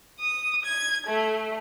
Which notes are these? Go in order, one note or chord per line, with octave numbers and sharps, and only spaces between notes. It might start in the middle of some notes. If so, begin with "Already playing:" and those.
D#6
G#6
A3